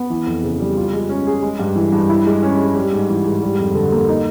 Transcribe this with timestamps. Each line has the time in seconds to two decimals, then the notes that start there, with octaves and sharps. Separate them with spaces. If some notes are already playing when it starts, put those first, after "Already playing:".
Already playing: B3
0.10 E3
0.26 F2
0.43 C#3
0.60 G3
0.77 F4
0.93 G#3
1.09 C#4
1.27 G#4
1.43 G#3
1.59 G2
1.76 E3
1.92 G2
2.09 E4
2.26 G#3
2.43 C#4
2.59 G#3
2.75 G3
2.92 G#2
3.09 E3
3.25 G#2
3.42 G3
3.59 F2
3.75 D3
3.92 A#3
4.09 D#4